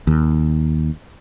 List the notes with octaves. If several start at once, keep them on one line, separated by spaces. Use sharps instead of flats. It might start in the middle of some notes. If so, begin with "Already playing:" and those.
D#2